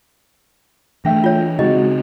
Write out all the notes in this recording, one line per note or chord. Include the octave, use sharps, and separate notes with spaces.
E3 A3 D4 E5 G5 A#6
F4 C#5
C#3 G#3 C4 D#4 F#4 D#5